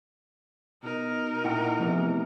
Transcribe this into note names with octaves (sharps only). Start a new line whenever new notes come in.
B2 D#4 A#4
A#2 E4 F#5 G5
E2 C3 E3 F3 A3 B3